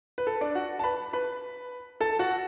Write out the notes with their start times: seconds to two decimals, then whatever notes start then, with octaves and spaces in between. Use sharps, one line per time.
0.18 B4
0.27 A4
0.41 D4 D5
0.55 F#4 F#5
0.79 A5
0.84 B4 B5
1.13 B4 B5
2.00 A4 A5
2.19 F#4 F#5